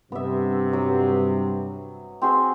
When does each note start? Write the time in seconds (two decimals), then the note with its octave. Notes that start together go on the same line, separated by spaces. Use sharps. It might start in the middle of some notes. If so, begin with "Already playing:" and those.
0.12 G2 C3 B3 E5
0.73 F#3
2.22 C4 F#4 G#4